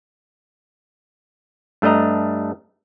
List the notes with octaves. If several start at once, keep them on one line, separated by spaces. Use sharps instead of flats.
G2 A3 D4 D#5 A#5